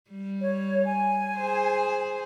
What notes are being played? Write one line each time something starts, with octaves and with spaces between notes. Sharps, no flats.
G3
C#5
G#5
G#4 C5